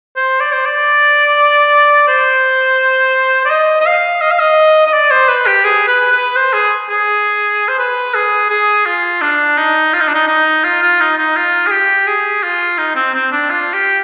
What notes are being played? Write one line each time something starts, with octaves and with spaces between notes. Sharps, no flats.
C5
D5
C5
D5
C5
D5
D#5
D#5
F5
D#5
F5
D#5
D#5
D5
C5
B4
G4
G#4
B4
B4
C5
G#4
G#4
C5
B4
G#4
G#4
F4
D4
D#4
F4
D#4
D4
D#4
D#4
F4
F4
D#4
D#4
F4
G#4
G4
G#4
F4
D#4
C4
C4
D4
F4
G4